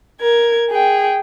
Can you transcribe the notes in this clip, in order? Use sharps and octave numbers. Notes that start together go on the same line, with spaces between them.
A#4 G#6
G#4 G5